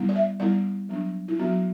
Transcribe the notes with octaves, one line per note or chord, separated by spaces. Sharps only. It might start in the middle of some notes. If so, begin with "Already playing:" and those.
Already playing: G3 B3 E4
D5
E5
G3 B3 E4 D5
F#3 B3 D4
E4
F#3 B3 D4 F#4